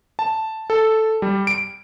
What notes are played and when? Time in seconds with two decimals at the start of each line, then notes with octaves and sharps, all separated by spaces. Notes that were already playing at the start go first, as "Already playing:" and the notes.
0.19 A5
0.70 A4
1.22 G3
1.47 D7